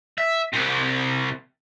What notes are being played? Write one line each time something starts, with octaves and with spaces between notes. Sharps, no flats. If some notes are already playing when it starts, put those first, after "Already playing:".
E5
C2 C3